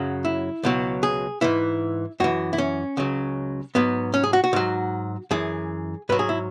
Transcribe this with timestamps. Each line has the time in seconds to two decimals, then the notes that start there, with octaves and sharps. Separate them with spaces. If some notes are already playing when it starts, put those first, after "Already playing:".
Already playing: F#2 C#3 F#3
0.25 E4
0.63 C#2 B2 F#3
1.03 G#4
1.41 G#2 E3 E4
2.20 F#2 E3 F#4
2.53 E4
2.58 C#4
2.97 C#2 C#3 F#3
3.75 G#2 F#3 B3
4.14 C#4
4.24 G#4
4.33 F#4
4.44 F#4
4.53 G#2 F#3
5.31 F#2 E3 G#4
6.09 G#2 F#3 B4
6.19 G#4
6.29 E4